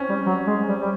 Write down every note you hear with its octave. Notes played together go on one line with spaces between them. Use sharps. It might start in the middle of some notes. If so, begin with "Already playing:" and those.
Already playing: C4 C#4
G3
F#3
G#3
G3
G3